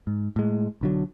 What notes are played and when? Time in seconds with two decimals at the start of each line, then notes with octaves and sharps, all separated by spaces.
0.07 G#2
0.36 A2 G#3
0.81 B1 D3 F#3